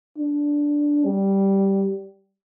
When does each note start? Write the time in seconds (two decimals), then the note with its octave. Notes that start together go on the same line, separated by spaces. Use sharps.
0.19 D4
1.05 G3